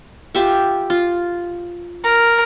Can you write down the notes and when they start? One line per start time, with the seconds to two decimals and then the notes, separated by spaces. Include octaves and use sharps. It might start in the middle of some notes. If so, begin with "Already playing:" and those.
0.35 F4 G4 E5
0.90 F4
2.04 A#4